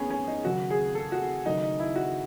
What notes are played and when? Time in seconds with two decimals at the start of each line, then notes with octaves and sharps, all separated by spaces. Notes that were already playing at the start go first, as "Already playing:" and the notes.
Already playing: G#2 A3 B3 C#4 G#4
0.10 C#4
0.28 D#4
0.44 D#2 C#3 F#3 F#4
0.70 G#4
0.95 A4
1.12 F#4
1.46 D#2 C#3 F#3 A3 D#4
1.63 D#4
1.80 E4
1.95 F#4